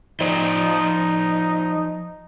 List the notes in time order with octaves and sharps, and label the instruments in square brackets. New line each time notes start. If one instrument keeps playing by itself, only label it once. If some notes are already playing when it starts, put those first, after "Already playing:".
[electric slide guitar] F3 C5 D5 [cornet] D#4